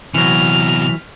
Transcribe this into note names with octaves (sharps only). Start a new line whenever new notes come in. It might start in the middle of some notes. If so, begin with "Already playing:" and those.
C3 E3 F#3 B3 F6